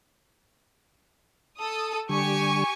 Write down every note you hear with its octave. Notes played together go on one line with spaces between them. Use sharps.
A4 D#6
D3 G3 G4 G#5 C#6